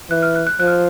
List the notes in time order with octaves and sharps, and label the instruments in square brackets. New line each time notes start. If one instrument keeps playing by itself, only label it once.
[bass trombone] E3 [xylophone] F#6
[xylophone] F6
F#6
F#6
[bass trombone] F3 [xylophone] F#6
[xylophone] F6